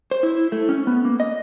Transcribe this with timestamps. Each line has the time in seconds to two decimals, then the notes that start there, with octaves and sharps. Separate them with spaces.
0.11 C5
0.23 E4
0.52 A3
0.69 C#4
0.87 B3
1.05 A#3
1.20 D#5